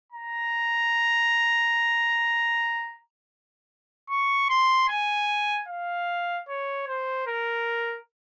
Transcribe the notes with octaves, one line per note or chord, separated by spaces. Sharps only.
A#5
C#6
C6
G#5
F5
C#5
C5
A#4